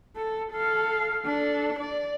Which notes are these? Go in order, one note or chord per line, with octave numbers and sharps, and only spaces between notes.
A4
A4 F5
D4 A4
D5